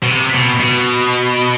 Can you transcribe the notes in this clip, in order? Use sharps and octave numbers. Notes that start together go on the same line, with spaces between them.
B2
C3
B2
B2